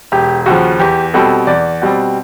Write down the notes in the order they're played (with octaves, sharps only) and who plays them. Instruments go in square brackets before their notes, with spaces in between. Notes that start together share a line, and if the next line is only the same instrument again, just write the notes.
[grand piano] E1 G4
D#2 C#3 F3 F#4
E2 G4
B2 G3 C4 A4
E2 D5
B2 G3 C4